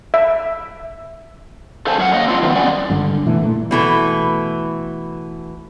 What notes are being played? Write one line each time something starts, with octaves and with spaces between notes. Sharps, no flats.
E5
A4 C5 C#5 F5 G#5 A5
F#2 C#4 F4 F#5
A#3 D#5
C4 D4 F4
D#3 F3 A3 B3
G3 B3 C#4 D5
G#1 G2 D3
B2 E3 A3
A#2 A3
B2 E3 A3